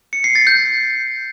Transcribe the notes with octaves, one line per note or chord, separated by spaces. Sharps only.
C#7
C7
A6
G6